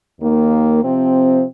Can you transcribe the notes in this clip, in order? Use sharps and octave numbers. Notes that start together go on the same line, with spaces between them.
D#2 D#3 A#3
C3 F3 C4